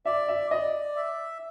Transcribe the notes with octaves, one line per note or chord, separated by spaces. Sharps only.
D5 E5
E5
D5 D#5
E5